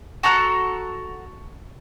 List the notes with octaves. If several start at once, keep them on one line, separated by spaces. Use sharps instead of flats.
F#4 A4 A#5 F#6